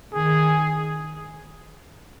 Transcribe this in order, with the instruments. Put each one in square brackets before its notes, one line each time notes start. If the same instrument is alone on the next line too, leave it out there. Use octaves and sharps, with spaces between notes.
[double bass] D#3 [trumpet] G#4